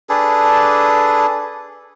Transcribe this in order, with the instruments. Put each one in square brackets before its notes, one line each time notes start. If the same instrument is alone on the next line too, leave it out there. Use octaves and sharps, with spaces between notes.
[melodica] D4 G#4 A4 B4